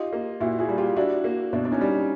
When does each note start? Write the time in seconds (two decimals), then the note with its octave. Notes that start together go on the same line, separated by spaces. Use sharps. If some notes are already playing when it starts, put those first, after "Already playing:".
Already playing: D#4 F4 G4
0.13 A#3
0.40 A#2 E4 F#4
0.59 F#4 G#4
0.69 G3
0.78 F4 G4
0.96 D4 E4 F#4
1.24 A#3
1.53 B2 D4 E4
1.65 D4
1.72 C#4 D#4
1.81 G3